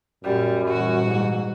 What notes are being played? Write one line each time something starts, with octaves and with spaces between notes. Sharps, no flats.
F#2 A#2 G3
A#2 E3 G3 F#4
G#2